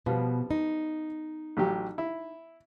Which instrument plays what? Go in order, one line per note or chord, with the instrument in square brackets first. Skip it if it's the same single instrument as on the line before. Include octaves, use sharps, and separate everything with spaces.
[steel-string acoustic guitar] B2 [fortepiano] F3 G3 B3
[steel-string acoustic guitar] D#4
[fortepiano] A1 F#3 G4
E4